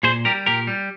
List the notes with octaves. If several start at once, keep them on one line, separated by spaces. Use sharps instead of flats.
A#2 G#4 C5
G3 G4 A#4
A#2 G4 A#4
G3